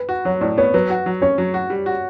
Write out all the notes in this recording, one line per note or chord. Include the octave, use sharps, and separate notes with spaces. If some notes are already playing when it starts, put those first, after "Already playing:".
Already playing: B4
F#4
F#3 C#5
A2 D5
B3 C#5
F#3 B4
F#4
F#3
C#4 C#5
F#3
F#4
G3
F#4